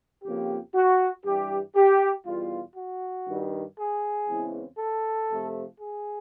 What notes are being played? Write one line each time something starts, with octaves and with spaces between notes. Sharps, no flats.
F2 C#3 F3 A#3 G4
F#4
G2 E3 G3 G4
G4
E2 B2 G3 F4
F#4
G2 D#3 G3
G#4
E2 C#3 E3 G#3 C4
A4
C3 F3 A3 C4
G#4